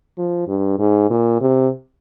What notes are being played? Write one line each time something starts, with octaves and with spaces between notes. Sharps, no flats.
F3
G2
G#2
A#2
C3